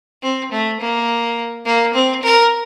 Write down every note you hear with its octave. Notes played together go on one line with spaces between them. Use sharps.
C4
A3
A#3
A#3
C4
A#4